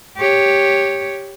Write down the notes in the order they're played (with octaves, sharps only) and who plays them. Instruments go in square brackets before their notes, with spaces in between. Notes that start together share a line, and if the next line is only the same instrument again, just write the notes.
[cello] G4 C#5